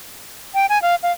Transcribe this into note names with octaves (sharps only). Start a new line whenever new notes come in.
G5
G#5
F5
F5